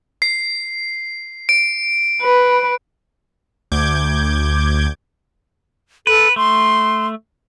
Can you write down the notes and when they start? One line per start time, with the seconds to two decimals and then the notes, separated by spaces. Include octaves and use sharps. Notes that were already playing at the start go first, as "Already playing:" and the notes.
0.22 C7
1.49 D7
2.23 B4
3.72 D2 D6 G6 G#6
6.07 A4 B4
6.36 A3 C6